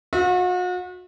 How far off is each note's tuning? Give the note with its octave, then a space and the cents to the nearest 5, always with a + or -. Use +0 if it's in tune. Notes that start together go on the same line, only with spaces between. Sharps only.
F#4 -40 E5 -5